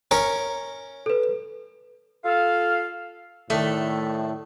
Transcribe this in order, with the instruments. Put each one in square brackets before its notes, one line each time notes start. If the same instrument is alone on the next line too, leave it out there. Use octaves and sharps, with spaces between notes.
[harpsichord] C#4 A#4 C#6
[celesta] A4 B4
[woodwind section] F4 A4 F5
[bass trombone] A2 [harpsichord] D#3 D4 [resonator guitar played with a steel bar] A3